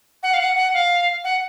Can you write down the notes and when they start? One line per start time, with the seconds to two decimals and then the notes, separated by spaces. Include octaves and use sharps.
0.23 F#5
0.34 F5
0.40 F#5
0.56 F#5
0.74 F5
1.24 F#5